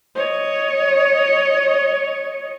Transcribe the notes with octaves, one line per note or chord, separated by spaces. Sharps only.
C#5 D#5